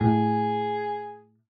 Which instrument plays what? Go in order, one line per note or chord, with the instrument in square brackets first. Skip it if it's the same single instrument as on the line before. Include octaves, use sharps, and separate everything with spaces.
[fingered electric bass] A2 [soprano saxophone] G#4